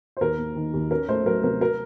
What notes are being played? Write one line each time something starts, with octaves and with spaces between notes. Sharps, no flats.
C5
D#2 A#4
A#3
D#3
D#2
C#4 A#4
A3 C5
F#3 A#4
C3 A#4
A#4